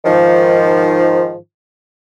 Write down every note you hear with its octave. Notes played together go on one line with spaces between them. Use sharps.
G#2 D#3 F3